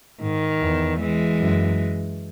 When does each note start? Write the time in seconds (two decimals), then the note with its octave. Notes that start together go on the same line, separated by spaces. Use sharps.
0.22 G#2 D#3
0.61 E2
0.99 E3 G#3
1.38 F#2